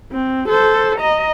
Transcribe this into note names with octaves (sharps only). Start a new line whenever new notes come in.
C4
A4 C5
D#5 A#5